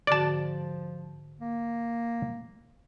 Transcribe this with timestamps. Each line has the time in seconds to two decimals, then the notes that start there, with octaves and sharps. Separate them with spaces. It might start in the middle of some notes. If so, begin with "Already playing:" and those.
0.07 G#2 D3 F3 F#4 D5 A5
1.41 A#3